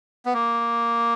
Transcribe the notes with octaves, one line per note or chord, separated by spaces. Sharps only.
B3
A#3